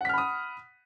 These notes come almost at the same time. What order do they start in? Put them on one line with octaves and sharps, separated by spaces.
F#5 B6 F6 B5 D#6